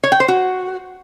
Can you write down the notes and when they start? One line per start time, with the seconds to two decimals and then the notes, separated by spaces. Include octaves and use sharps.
0.04 C#5
0.12 G5
0.20 C5
0.28 F#4